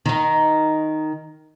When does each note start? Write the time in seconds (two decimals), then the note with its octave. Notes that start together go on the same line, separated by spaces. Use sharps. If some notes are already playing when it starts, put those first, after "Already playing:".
0.06 D#3 D#4